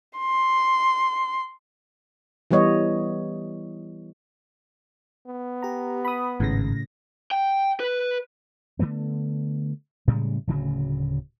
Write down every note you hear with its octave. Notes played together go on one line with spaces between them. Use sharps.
C6
E3 G3 B3 C#5 D#5
B3
G4 A#5
B5 D#6
G#1 A2 C#3 A#6
G5
B4
D3 F3 A3 B3
A2 C#3 G3 G#3
D1 D2 C#3 F#3